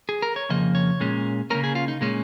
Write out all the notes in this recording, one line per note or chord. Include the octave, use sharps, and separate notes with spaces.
G#4
A#4
C#5
F2 C#3 F3 A#3 D#5
C#5
A#2 G#3 C#4
C#3 A#3 C#4 A#4
G#4
F4
D#4
A#2 G#3 C#4